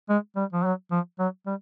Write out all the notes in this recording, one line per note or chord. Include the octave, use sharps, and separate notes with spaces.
G#3
G3
F3
F#3
F3
F#3
G3